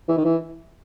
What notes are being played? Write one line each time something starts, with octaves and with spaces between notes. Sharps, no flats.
E3
D#3
E3